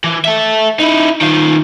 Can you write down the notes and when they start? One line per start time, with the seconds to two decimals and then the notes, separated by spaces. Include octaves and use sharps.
0.04 E3
0.25 A4 E5
0.79 D#4 E4
1.21 D#3 F4